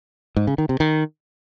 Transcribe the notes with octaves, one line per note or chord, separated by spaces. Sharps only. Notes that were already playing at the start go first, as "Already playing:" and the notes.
G#2
C#3
D#3
C3
D#3